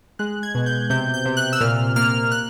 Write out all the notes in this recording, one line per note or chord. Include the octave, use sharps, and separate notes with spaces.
G#3 F#6
G#6
B2
G6
C3 G6
G6
C3
F#6
E6
A#2 F6
A#3 F6
F#6